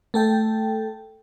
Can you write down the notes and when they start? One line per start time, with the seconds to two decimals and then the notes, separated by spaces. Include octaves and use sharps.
0.14 A3 A4 G5